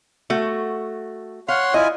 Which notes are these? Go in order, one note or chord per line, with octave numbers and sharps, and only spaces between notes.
A3 F#4
C#5 F5 F#5 C6
E4 F4 D#5 G#5